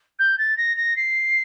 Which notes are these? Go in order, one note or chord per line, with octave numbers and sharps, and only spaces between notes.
G6
A6
A#6
A#6
C7